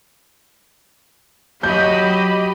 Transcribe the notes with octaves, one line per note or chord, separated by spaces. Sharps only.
F#3 G4 D#5 B5 G6